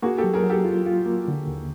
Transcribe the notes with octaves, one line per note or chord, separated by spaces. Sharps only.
A#3 F#4 G#4
G4 A4
F#3
G#4 A#4
F#3
G4 A4
F4
F4
A#3
D3
D#2